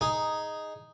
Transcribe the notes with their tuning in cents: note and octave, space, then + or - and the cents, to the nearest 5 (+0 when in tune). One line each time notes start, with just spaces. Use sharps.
D#4 +0 G#4 +0